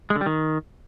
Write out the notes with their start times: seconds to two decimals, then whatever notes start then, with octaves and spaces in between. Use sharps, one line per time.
0.10 G#3
0.16 D3
0.21 G3
0.26 D#3